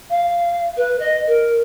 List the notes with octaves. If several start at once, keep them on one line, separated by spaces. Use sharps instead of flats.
F5
B4
D#5
A#4